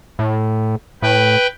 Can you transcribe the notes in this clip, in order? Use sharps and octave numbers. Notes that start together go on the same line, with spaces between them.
A2
A2 B4 G5